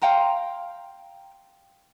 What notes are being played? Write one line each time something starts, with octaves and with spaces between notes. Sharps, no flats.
F5 G5 A#5 C6